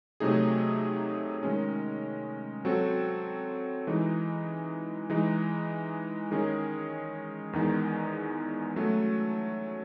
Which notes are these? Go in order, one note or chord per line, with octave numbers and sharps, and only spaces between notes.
C3 F#3 A3 D#4 G#4
D#3 G#3 C#4
F#3 C4 F#4 A4
E3 G#3 D#4
E3 G#3 D#4
D#3 G#3 C#4 G#4
E2 D#3 G#3 D#4
F#3 A3 C#4 F#4 A4